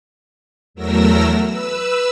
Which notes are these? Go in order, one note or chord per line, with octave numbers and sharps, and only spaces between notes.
E2 F#3 A3 A#4 E6 A#6
B4 E6